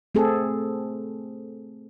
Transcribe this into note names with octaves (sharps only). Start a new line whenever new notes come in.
A3 C4 G#4 A4